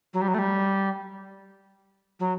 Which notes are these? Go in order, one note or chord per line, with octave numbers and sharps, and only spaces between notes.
F#3
G3
F#3
A3
G3
F#3